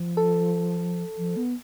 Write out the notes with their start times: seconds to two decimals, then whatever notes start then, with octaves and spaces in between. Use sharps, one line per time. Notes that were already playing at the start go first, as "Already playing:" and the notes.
Already playing: F3
0.17 A4
1.18 F3
1.37 B3